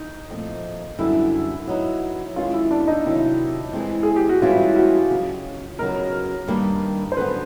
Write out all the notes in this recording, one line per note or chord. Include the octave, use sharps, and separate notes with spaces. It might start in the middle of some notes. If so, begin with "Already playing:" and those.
Already playing: D#4
A#2 F3 A3 C4
F#2 D3 G3 B3 E4
F#3 B3 D#4
F#2 D#3 G#3 C#4 F4
E4
D4
D#4
C3 D#3 F#3 E4
E3 G#3 C4
G#4
G4
F#4
G2 E3 G#3 C#4 E4 F4
F#4
C#3 F#3 B3 D#4 F#4
C#3 F#3 B3 D#4 A#4
G2 D#3 G3 A#3
C5
F#2 D3 G3 B3 B4